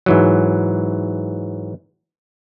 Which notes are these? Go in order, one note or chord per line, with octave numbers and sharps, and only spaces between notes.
G#2 E3 F#3